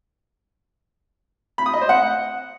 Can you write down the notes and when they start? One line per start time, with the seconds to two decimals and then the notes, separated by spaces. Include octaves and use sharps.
1.58 B5
1.66 D#6
1.74 D#5
1.81 C5
1.89 F#5